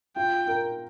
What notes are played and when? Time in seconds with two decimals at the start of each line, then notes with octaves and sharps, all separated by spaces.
0.16 F4 G5
0.47 A#4